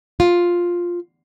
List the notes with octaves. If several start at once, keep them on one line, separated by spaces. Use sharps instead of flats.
F4